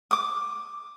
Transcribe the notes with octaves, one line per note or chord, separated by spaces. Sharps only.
D6 D#6